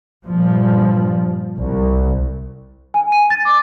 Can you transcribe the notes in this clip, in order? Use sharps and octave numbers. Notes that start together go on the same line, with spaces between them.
G2 A#2 F3
C2
G#5
D#7
A6
D6